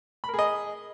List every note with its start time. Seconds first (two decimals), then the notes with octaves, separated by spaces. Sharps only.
0.24 B5
0.29 A#4
0.34 G#4
0.39 D#5